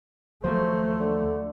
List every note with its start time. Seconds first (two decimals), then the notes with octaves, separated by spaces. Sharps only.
0.44 D#2 F3 F#3 A3 C5
1.00 D3